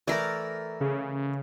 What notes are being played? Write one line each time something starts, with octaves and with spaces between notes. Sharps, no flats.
E3 A3 A#4 D5
C#3